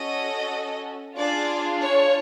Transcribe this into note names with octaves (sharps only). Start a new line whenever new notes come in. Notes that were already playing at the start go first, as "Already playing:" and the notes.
Already playing: C#4 F#4 A4 D#5
D4 F4 G#4 D5
C#5